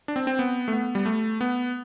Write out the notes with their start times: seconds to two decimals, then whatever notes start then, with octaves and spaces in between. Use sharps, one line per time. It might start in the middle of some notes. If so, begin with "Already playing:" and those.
0.08 D4
0.16 C4
0.27 C4
0.39 B3
0.68 A3
0.73 B3
0.95 G3
1.06 A3
1.41 B3